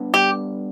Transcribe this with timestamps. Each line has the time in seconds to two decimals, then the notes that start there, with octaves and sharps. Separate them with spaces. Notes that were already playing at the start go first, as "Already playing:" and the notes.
Already playing: G3 B3 D4
0.14 G3 G4